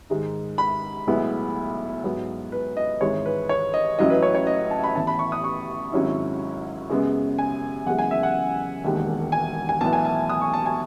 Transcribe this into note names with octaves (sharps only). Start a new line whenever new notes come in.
G#2 D#3 G#3 D#4
B5
B1 A2 G#3 B3 E4
G#2 F#3 B3
B4
D#5
G#1 G#2 E3 G#3 C#5
B4
C#5
D#5
A1 A2 F#3 C#4 E4 D#5
B4
C#5
C#5
D#5
A5
B5
A1 A2 E3 B3 A5
B5
C#6
D#6
C#6
G#1 G#2 F#3 C#4 E4
F#2 C#3 G#3 B3
G#5
F#1 E2 C#3 E3 G#3 F#5
G#5
E5
F#5
E1 D#2 D#3 G#3
G#5
G#5
B1 A2 E3 B3 A5
G#5
A5
D#6
C#6
A5
G#5